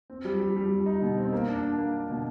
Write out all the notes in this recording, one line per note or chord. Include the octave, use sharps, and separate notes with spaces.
C4
G3
G3
G3
G3
D#4
B2
C4
A#3
D4
D4
A#3
D4
B2